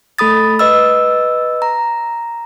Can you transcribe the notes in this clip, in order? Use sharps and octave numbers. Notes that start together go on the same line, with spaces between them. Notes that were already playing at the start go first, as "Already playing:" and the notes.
A3 A4 B5 D#6 A6
B4 D#5 E6
A#5